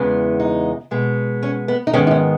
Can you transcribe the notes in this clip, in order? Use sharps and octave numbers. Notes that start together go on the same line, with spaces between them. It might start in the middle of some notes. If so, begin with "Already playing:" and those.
Already playing: E2 C#3 E3 G#3 B3
D#4
B2 G#3 B3
C#4
B3
D#4
G#2 D#3 G#3 B3 C#4
D#4
C#4